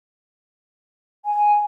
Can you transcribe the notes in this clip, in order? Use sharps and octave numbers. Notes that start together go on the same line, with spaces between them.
G#5